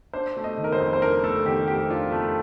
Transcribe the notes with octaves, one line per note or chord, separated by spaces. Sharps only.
D4 C5
A3
D#5
D#3
A#4
C5
F2
C5
D4 A#4
A3 A4
D#3 G4
F2 G4
D4 F4
A3